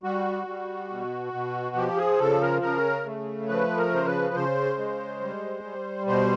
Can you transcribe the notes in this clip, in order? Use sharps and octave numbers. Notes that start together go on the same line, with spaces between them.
G3 F#4
G3
B2
B2
F3 G4
G#4
C#3 A4
A#4
C#3 A#4
A3
F3 B4
A#4
C#3 C5
B4
C#3 C5
G#3
G3
G3
B2 C5